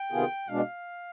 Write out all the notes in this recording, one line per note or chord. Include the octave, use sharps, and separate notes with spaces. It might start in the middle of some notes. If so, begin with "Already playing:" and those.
Already playing: G5
C3 D#3 B3 F4 G#4
B2 G#3 D4 F5